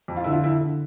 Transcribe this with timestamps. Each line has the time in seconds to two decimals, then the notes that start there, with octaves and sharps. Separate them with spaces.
0.08 F2
0.16 F4
0.24 D3 E4
0.32 F4
0.44 D3 E4
0.61 D3